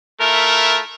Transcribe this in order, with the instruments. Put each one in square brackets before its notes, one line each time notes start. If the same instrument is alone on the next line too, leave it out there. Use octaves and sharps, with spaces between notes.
[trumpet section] A3 E4 F4 A#4